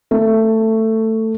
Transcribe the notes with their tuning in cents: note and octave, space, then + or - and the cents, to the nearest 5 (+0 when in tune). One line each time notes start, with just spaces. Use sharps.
A3 +15